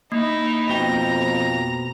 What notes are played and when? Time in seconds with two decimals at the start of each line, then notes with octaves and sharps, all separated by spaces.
0.12 A#3 D#4 E4
0.70 F2 B2 G5 A#5